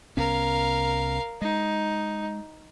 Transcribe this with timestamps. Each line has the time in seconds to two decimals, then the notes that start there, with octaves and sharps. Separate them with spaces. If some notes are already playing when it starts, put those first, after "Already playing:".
0.17 C2 B3 C#4 A#4 F5
1.42 G#3 D#4